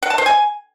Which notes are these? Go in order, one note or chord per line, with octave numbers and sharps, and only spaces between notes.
F#5
A5
C5
G#5